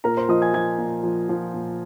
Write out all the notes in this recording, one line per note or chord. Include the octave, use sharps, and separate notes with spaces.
A#2 A#4 A#5
C5 C6
F3 D#5 D#6
G#5 G#6
F3 G#5 G#6
A#2
F3
F3
A#2